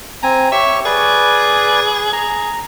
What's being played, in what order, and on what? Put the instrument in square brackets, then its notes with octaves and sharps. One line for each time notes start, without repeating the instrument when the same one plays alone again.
[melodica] C4 G#5 [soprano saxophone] A#5
[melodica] G4 C#5 C#6 [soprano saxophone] E5
[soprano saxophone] G#4 [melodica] B4 D5
[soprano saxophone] G#4 [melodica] A#5